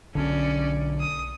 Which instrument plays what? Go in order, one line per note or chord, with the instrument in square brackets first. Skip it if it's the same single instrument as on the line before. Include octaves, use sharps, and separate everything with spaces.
[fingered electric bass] B1 D3 [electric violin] C#4 D5
[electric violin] D#6